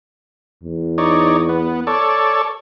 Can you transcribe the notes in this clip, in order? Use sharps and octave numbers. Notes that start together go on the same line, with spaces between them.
E2
D#4 C#5 D5
B3
A4 C#5 D5